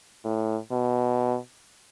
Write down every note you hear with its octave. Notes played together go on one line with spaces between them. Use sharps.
A2
B2